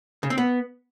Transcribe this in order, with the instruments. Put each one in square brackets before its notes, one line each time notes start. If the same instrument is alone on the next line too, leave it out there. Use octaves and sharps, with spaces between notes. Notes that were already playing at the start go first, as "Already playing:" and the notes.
[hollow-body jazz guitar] C#3
C4
B3